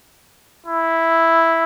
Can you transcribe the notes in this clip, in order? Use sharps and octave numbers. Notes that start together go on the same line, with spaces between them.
E4